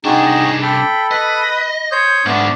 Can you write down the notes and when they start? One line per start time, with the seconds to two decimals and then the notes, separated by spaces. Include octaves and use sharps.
0.05 C2 C4 D4 D#4 F#4 G#4
0.26 D#5
0.63 A4 G5 B5
1.11 B4 D#5
1.91 C5 C#5 D#6 G6
2.26 G#2 D3 A3 B3 D4